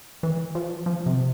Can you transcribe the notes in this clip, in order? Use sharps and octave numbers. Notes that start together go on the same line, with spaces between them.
E3
F3
F3
C3